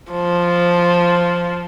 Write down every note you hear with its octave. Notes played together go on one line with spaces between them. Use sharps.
F3